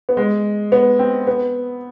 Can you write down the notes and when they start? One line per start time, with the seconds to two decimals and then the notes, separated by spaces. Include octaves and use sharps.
0.09 B3
0.17 G#3
0.72 B3
0.99 C4
1.27 B3